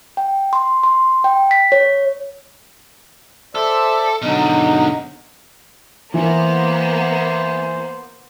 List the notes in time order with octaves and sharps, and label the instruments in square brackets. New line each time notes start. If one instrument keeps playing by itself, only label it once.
[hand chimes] G5
C6
C6
G5
B6
C#5
[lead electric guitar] A4 [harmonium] C5 D5 E5
[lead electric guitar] B2 D3 [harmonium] F#3 D#4
[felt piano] E3 [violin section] A#3 B3 [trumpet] C5